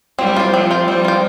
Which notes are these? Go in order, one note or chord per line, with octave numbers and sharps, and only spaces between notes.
G3 C4
F4 C5
F3 C4
F4 C5
G3 C4
F4 C5